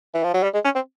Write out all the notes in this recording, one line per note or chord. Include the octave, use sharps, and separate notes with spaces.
E3
F3
F#3
G3
G#3
C#4
C4